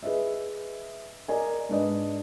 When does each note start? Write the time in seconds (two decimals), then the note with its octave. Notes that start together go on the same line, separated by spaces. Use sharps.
0.03 G#4 B4 D#5 E5
1.28 A#4 D5 D#5 G#5
1.69 G#2 D4 B4 D5 D#5